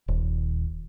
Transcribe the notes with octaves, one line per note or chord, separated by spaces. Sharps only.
D#1